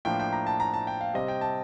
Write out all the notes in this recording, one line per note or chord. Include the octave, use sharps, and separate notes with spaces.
A2 F3 A#3 D4 G5
G5
A#5
A5
A#5
A5
G5
F5
C3 G3 C4 D#5
G5
A5